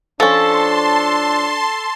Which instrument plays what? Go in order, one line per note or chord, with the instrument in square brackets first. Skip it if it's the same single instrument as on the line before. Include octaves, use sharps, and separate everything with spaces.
[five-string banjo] F3 C#4 [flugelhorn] D4 [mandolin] A4 [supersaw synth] A5 C6